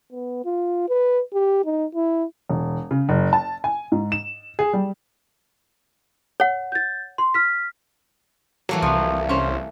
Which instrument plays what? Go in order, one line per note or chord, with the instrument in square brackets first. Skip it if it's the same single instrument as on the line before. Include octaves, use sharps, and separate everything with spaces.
[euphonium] B3
F4
B4
G4
D#4
E4
[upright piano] E1
C#3
F#1
A5
G#5
G#2
E7
G#4
G3
[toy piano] C#5 F#5
[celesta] G6 A6
C6
F6 B6
[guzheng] E3 A3 A#3 [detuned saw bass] F#3
[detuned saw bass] C2 [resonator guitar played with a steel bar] F3 F#3
[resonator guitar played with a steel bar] C#4 C5